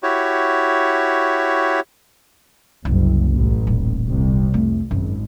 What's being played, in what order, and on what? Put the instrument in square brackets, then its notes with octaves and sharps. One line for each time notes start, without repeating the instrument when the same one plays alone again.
[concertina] E4 F#4 G4 C#5
[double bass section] F#1 [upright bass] C2
[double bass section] A1
[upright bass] D#1
[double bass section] C2
[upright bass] F2 A3
[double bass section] G#1 [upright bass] F#2